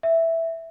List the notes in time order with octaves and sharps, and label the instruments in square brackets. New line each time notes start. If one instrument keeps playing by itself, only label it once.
[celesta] E5